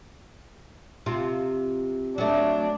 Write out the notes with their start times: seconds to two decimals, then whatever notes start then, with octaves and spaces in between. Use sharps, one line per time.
1.06 C3 F4
2.18 F#3 A3 D4